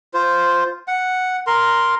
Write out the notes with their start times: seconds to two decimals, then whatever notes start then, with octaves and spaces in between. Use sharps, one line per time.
0.14 F4 C5
0.88 F#5
1.47 A#4 C6